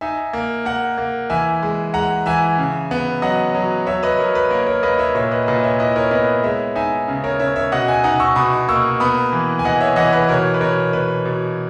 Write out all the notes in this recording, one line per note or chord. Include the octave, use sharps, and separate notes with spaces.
D#4 E5 G#5
A#3
A#3 F#5 A#5
A#3
E3 E5 G#5
G#3
G#3 F#5 A#5
E3 E5 G#5
C#3
B3
F#3 D#5 F#5
F#3
F#3 C#5 E5
B4 D#5
F#3 A#4 C#5
B4
A#3 A#4 C#5
A#4 C#5
A#3 B4 D#5
C#5 E5
A#2 C#5 E5
B4 D#5
A#2 B4 D#5
C#5 E5
E4 B4 D#5
A#4 C#5
B3 B4 D#5
G#3 C#5 E5
D#4 E5 G#5
C#3
A#4 C#5
C#3 C#5 E5
C#5 E5
B2 D#5 F#5
E5 G#5
D#4 F#5 A#5
C#6 E6
B2 B5 D#6
A#3 C#6 E6
B3 B5 D#6
E3
G#5
E3 D#5 F#5
C#5 E5
E3 D#5 F#5
B4 D#5
B2 A#4 C#5
B4
B2 A#4 C#5
B2 B4
B2